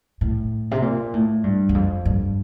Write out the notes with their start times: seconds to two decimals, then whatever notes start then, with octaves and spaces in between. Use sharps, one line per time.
0.21 A2
0.71 C3
0.82 A#2
1.14 A2
1.44 G2
1.69 E2
1.74 F2
2.05 G2